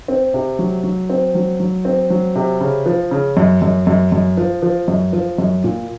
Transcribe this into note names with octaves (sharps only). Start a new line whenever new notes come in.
C4
C3
F#3
F#3
C4
F#3
F#3
C4
F#3
C3
C#3
F3
C#3
F#2
F#2
F#2
F#2
F3
F3
F#2
F3
F#2
A#2